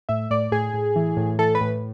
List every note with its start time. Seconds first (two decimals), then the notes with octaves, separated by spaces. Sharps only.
0.09 A2 E5
0.30 A2 D5
0.52 A2 G#4
0.74 A2
0.96 E3
1.17 A2
1.39 E3 A4
1.55 B4
1.61 A2